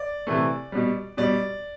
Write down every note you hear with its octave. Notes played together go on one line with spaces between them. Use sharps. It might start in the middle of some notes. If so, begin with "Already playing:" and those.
Already playing: D5
C3 E3 A3
B2 G3
B2 G3 D5